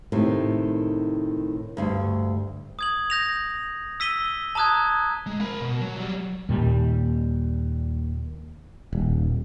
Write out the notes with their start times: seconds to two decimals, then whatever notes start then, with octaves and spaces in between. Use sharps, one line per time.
0.12 A2 C3 D#3
1.77 D2 G2
2.79 D#6 G#6 F#7
3.10 G6 A#6 F7
4.00 E6 B6 D#7 G7
4.55 A5 A#5 D#6 F#6 G#6
5.26 G#3
5.41 A#4 B5
5.61 B2
5.81 F#3
5.97 F#3 G3
6.49 D#2 A#2 G3
8.93 D#1